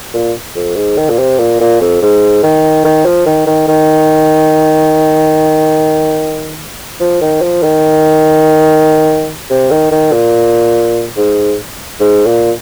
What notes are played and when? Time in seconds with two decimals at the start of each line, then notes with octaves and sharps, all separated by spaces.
0.14 A#2
0.55 F2
0.76 G#2
0.97 D#3
1.09 A#2
1.18 C3
1.39 A#2
1.60 A#2
1.81 F2
2.02 G#2
2.43 D#3
2.85 D#3
3.05 F3
3.26 D#3
3.47 D#3
3.68 D#3
7.00 F3
7.21 D#3
7.42 F3
7.63 D#3
9.50 C3
9.71 D#3
9.91 D#3
10.12 A#2
11.17 G#2
12.00 G#2
12.27 A#2